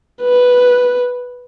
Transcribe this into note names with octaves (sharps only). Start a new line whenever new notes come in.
B4